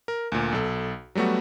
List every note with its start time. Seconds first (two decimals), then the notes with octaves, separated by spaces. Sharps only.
0.08 A#4
0.32 D2 A#2
0.52 B1 A4
1.15 F#3 G3 A3 B3 F#4